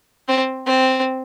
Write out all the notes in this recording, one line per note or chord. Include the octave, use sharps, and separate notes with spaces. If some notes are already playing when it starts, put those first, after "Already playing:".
C4
C4